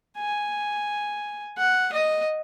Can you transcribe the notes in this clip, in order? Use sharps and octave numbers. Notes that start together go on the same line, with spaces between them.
G#5
F#5
D#5